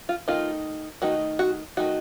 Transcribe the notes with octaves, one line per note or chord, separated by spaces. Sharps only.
F4
D#3 A3 D#4 F4
D#3 A3 D#4 F#4
F#4
D#3 A3 D#4 F#4